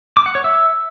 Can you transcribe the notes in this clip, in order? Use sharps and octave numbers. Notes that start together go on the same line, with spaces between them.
D6
F#5
C#5
E5